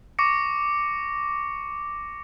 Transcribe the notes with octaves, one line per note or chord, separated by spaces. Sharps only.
C#6 D6 A#6 C#7